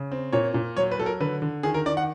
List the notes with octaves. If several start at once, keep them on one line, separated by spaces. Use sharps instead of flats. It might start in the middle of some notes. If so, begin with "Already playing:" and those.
Already playing: C#3
C4
A#2 C#5
A#2
F#3 C#5
B4
F#3 A4
A#4
D3 B4
D3
D#3 G#4
A#4
D#3 D5
F#5